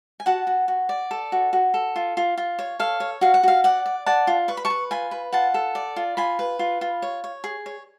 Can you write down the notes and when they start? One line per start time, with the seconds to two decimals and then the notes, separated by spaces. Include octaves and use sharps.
0.20 G#5
0.26 F#4 F#5 A5
0.47 F#4
0.68 F#4
0.89 D5
1.11 A4
1.32 F#4
1.53 F#4
1.74 A4
1.96 F4
2.17 F4
2.37 F4
2.59 C#5
2.79 A4 F5
3.00 C#5
3.21 F#4 F5
3.34 F#5
3.43 F#4 F5
3.64 D5 F#5
3.86 D5
4.06 D5 F#5 A5
4.27 F4
4.48 B4 C#6
4.57 B5
4.65 A5 C#6
4.70 B4
4.91 F4 G#5 B5
5.11 B4
5.33 F4 F#5 A5
5.54 A4
5.75 D5
5.96 F4
6.17 F4 G#5 B5
6.39 B4
6.59 F4
6.81 F4
7.02 C#5
7.24 C#5
7.44 G#4
7.66 C#5